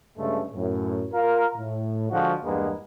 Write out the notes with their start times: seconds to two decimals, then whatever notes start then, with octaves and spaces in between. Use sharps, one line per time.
0.17 G2 C#3 G#3 A3
0.53 F#2 A2
1.13 F4 A#4
1.56 A2
2.10 D3 F3 G#3 F#4
2.44 E2 G2 G#3 A#3 B3